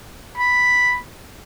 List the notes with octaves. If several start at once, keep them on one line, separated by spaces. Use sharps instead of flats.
B5